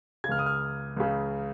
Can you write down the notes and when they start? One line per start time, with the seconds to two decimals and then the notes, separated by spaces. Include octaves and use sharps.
0.24 C#3 G#6
0.29 C#2 F6
0.39 D#6
0.46 F6
0.97 C#2 C#3